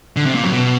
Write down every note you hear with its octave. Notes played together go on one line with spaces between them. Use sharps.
D3
C3
A#2
F#2
B2